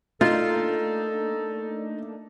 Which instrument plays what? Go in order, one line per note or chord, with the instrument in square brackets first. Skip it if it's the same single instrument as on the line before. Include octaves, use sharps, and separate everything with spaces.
[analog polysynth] A3 A#3 D4 [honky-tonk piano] D#4 [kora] F4 [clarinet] A4